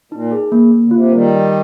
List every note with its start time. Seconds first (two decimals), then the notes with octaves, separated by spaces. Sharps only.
0.12 A#2 D#4
0.32 G#4
0.52 A#3
0.71 A#3
0.84 D3
0.91 C3 F4
1.12 D#3 G3 A#4
1.32 G5